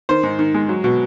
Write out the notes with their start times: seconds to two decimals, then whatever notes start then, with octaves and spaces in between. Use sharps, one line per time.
0.09 D#3 C5
0.23 G#2
0.39 D#3
0.54 G#3
0.69 F#3
0.84 B2